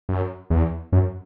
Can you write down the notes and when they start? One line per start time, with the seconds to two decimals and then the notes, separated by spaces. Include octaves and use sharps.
0.09 F#2
0.50 E2
0.92 F#2